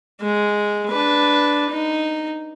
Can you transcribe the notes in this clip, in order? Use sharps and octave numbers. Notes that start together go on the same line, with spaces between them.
G#3
D4 B4
D#4